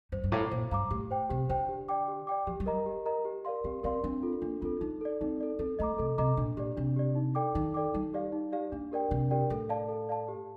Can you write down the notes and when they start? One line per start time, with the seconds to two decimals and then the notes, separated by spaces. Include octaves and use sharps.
0.12 G2 C5
0.24 G2
0.32 A2 F5 A#5 D6
0.51 A#2 C5
0.71 G2 F5 A#5 D6
0.90 A2 G4
1.11 C5 G5
1.29 C3 G4
1.49 D3 C5 G5
1.69 G4
1.88 D5 G5 D6
2.08 G4
2.27 D5 G5 D6
2.47 F3 G4
2.60 G3
2.66 A#4 D#5 A#5
2.86 G4
3.06 A#4 D#5 A#5
3.25 G4
3.45 A#4 D5 F5 C6
3.64 C4 G4
3.83 C4 A#4 D5 F5 C6
4.03 C4 D4
4.23 F4 A4
4.42 A#3 D4
4.61 C4 F4 A4
4.81 D4 D#4
5.01 A4 D5
5.21 C4 D#4
5.40 A4 D5
5.59 C4 A4
5.79 A3 D#5 A#5 D6
5.98 C3 A4
6.18 C3 D#5 A#5 D6
6.37 A#2 D4
6.57 A#2 G4 D5
6.77 C3 D4
6.96 G4 D5
7.15 D#4
7.35 A4 D5 G5 D6
7.55 D#3 D#4
7.74 A4 D5 G5 D6
7.94 G3 D#4
8.14 G4 D5 F5
8.32 D#4
8.52 G4 D5 F5
8.72 A#3 D4
8.92 G4 A#4 D5 G5
9.10 C3 D4
9.31 G4 A#4 D5 G5
9.50 A2 A4
9.69 D5 F5 A5
9.89 A4
10.09 D5 F5 A5
10.28 G4